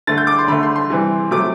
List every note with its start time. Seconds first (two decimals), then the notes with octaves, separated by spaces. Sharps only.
0.07 D3 A3 A6
0.18 G6
0.27 D6
0.39 C6
0.48 D3 A3 B5
0.63 C6
0.76 C6
0.90 C3 E3 G3
1.31 C3 F#3 A3 D6